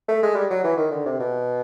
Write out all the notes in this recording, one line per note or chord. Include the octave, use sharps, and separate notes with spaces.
A3
G#3
G3
F#3
E3
D#3
D3
C3
B2